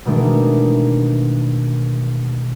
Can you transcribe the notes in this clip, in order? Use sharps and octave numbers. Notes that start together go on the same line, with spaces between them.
B2 D#3 E3 G#3 A3 D4